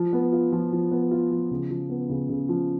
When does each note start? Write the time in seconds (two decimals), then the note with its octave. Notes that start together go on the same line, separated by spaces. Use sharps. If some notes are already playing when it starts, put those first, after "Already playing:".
Already playing: F3
0.13 B3
0.32 F4
0.52 F3
0.72 F3
0.91 B3
1.11 F4
1.31 F3
1.51 C#3
1.70 F3
1.89 B3
2.09 C#3
2.29 C#3
2.49 F3